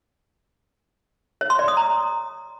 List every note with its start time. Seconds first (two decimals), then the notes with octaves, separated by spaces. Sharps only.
1.41 C#5
1.50 C6
1.59 D5
1.68 D#6
1.77 A#5